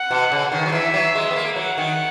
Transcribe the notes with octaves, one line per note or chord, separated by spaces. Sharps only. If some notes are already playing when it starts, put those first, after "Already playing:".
Already playing: F#5
B2
C#3
D#3
F#3
E3 E5
F#3
G#3
B3
A#3
F#3 F#5
D#3